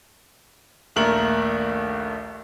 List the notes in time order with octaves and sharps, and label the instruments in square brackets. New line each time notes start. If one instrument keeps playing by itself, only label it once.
[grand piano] A#1 D#2 A3 A#4 F#7